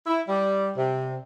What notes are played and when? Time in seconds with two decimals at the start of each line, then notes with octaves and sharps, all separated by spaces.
0.07 E4
0.28 G3
0.76 C3